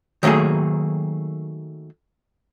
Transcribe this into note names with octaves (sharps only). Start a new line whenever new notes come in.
D#3 F#3 A3 A#3 G#4